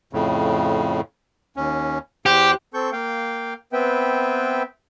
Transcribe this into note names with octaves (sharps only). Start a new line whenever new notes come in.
F2 A2 C#3
D#2 C#4
E2 G4 C5 F#6
C4 A4 C#6 G6
A#3 F5 G5
B3 C4 B4 E5 G5